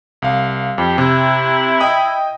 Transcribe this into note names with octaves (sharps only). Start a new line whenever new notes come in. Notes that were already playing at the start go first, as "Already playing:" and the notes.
C2 F5
F2 G4
C3 E4
D#5 G5 D#6